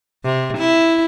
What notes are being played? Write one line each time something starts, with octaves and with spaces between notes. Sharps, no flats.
C3
E4